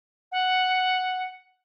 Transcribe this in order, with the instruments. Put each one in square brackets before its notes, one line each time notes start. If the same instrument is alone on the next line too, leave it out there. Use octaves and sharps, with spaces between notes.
[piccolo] F#5